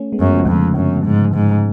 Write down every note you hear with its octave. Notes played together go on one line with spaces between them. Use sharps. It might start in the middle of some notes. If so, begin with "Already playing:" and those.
Already playing: A3 C#4
G#3 B3
F#2
C#3 F3
F2 D3
C#3
F#2 D3
G#2
G#2